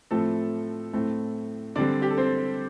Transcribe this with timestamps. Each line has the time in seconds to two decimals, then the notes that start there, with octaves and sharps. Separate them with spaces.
0.11 A2 F3 A3 C4 A4
0.93 A2 A3 C4
1.75 D3 G3 C4 D4 D5
2.02 G4
2.10 A4
2.18 C4 C5